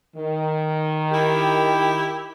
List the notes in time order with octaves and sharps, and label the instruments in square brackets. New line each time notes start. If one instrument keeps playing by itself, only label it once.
[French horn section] D#3
[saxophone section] E4 G4